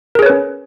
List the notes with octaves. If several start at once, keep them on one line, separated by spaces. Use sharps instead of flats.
C#4 G#4 A#4 B4 C#5